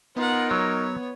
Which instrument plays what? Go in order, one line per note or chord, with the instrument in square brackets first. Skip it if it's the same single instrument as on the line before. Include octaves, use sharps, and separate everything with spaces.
[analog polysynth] B3 [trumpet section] D#4 A#4 [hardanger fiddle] F4 F#5
[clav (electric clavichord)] F#3 [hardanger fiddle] C#5